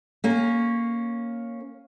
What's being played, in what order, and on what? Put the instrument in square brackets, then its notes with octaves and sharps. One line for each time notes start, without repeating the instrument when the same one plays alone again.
[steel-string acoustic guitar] A#3 C#4